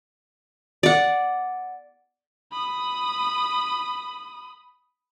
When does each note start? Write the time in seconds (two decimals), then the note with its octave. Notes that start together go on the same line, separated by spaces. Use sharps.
0.83 D5 F#5
2.52 B5 D#6